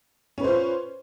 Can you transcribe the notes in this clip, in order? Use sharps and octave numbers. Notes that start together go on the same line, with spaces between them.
C#4 F4 B4 C5